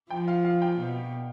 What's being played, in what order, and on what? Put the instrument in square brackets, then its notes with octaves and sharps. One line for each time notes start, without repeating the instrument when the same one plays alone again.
[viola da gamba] F3 [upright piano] G5
[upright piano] F5
F5
G5
[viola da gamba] B2